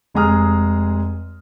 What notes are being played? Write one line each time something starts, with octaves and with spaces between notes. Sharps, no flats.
F1 G#3 G#4 A#5 D#6 F6